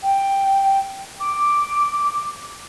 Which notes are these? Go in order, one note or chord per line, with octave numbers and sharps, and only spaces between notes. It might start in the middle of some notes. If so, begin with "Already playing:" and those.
G5
D6